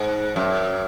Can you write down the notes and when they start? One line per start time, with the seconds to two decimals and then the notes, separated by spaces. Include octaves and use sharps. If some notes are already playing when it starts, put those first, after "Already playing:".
Already playing: G#2
0.36 F#2